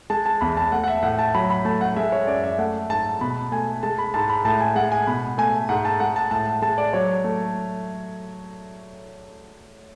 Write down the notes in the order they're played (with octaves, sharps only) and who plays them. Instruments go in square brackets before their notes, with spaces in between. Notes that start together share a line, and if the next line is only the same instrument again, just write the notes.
[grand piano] G#3 A5
A5
E2 B5
A5
A3 F#5
F#5
E5
A2 F#5
A5
F#3 B5
B5
A3 A5
F#5
G#3 E5
C#5
F#2 D5
E5
A3 F#5
G#2 A5
B2 B5
A3 G#5
G#3 A5
B5
G#2 A5
B5
A2 A5
G#5
G#3 F#5
G#5
B2 B5
A3 G#5
G#2 F#5
A5
G#3 F#5
A5
A2 A5
G#3 A5
D5
F#3 C#5
A3